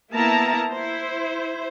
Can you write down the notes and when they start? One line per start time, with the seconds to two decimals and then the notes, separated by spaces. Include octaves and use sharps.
0.12 A#3 B3 E4 A#4 A5 A#5
0.70 E4 C5